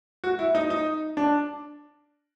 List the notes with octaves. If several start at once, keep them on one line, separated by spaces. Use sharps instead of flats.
F#4
E4
D#4
D#4
D4